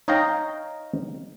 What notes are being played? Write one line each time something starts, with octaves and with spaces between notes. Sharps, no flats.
D#4 C#5 D#5 F5 G5 A#5